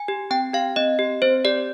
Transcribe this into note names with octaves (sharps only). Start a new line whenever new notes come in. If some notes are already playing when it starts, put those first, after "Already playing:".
Already playing: G#5
G4
C4 G5
G4 F5
C4 D#5
G4
C4 C5
G4 D5